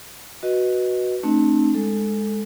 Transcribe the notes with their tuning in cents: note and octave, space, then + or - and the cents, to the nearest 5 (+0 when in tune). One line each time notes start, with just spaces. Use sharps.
F#4 +0 B4 -10 D#5 +0
A3 +0 C4 +35 D#4 -45
G#3 +0 A4 +0